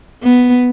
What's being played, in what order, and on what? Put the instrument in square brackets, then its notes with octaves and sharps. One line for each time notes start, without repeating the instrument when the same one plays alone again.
[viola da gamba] B3